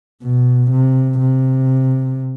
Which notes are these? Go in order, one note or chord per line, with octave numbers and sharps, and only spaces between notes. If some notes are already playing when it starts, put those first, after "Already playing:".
B2
C3
C3